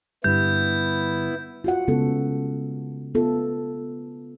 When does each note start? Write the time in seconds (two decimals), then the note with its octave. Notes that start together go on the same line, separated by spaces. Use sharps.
0.24 G2 D3 G3 B3 E4 G6
1.64 F4 F#4 F#5
1.88 C#3 G#3 B3 C#4 A4
3.15 B3 F4 A4